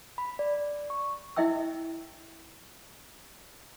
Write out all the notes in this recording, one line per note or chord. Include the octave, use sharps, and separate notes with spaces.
B5
D5
C#6
E4 D#5 E5 G5 E6